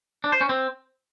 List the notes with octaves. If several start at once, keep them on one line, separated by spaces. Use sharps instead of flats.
D4
C5
C#4
C4